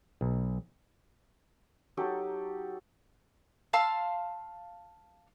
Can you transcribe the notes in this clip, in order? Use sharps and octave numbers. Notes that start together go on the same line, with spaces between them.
B1
F#3 D#4 G4 A4
F5 A5 C6 E6